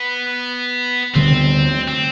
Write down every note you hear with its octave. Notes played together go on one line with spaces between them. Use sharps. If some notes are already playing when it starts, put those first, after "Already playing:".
Already playing: B3
D2 D3 G3 B3 C4
C4